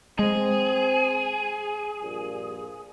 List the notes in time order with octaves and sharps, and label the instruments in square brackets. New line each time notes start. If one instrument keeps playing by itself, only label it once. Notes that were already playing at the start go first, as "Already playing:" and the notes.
[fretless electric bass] G#3 [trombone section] C4 [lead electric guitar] G#4
[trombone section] A#1 G2 A#2